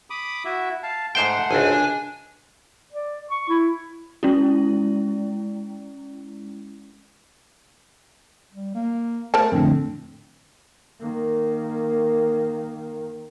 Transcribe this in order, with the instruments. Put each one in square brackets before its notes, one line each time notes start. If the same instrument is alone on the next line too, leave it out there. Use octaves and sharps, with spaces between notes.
[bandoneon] B5 D6 D#6
E4 F#4 E5
F5 A5
[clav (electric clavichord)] G#2 C5 G5 [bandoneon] A3 F#5 C6
[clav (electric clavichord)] G#1 C#2 [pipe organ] D4 G#5
[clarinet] D5
C#6
E4
[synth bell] G#3 C#4 E4
[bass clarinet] G3
A#3
[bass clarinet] A3 [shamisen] A#4 C5 A5
[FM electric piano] F2 A2 D3 [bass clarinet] C4
[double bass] D#3 A#3